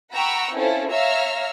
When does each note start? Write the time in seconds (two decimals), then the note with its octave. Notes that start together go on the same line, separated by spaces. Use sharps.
0.14 F#5 G5 A#5 B5 C#6 E6
0.55 C4 C#4 E4 F4 A4 C5
0.90 C#5 E5 F5 A#5 E6 F6